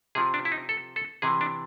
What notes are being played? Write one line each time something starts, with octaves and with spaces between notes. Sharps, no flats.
C3 F3 G#4
D4
E4
D#4
A4
A4
C3 E3 G#4
D4